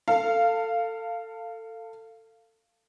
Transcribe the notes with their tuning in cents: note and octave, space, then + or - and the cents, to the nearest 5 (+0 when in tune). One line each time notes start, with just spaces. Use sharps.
A4 +25 F5 -10